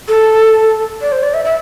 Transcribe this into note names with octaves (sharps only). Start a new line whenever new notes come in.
A4
D5
C5
D5
E5
E5